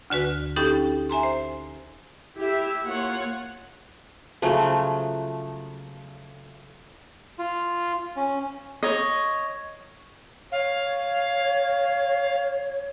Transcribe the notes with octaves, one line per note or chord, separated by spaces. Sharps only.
D2 D3 F#4 B4
C#4 D#4 G4 A4 G5 B5
E5 G#5 A#5 C6
C5
E4 G4 E5
A#3 F4 C#5 F#5
C#3 F3 F#3 A3
F4
C#4
C#5 D#5
C#5 F5